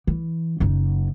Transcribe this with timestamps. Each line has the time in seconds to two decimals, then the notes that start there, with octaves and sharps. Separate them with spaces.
0.07 E3
0.60 F#1 D#4